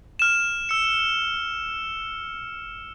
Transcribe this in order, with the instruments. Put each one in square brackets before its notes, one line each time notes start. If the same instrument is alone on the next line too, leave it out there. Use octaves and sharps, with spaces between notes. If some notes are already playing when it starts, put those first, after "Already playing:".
[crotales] F6 E7
E6 C#7